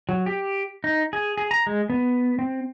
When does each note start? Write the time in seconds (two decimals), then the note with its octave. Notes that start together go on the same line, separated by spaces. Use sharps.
0.09 F#3
0.26 G4
0.84 D#4
1.13 G#4
1.37 G#4
1.51 A#5
1.67 G#3
1.90 B3
2.39 C4